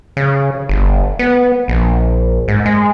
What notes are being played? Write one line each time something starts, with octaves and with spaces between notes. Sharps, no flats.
C#3
G1
B3
A#1
G#2
G#3